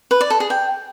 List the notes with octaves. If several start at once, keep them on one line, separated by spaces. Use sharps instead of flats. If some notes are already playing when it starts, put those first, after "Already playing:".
B4
D5
A4
G#4
G5